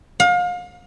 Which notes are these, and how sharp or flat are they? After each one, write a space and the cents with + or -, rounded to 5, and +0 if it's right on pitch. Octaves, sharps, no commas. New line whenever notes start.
F5 +35